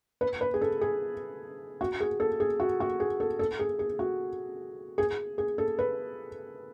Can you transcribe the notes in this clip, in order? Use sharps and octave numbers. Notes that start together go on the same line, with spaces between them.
B4
B4
G#4
A4
G#4
F#4
G#4
A4
G#4
F#4
F#4
G#4
A4
A4
G#4
G#4
F#4
G#4
G#4
A4
B4